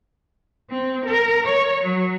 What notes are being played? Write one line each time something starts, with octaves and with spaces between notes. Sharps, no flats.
C4
A#4
C#5
F#3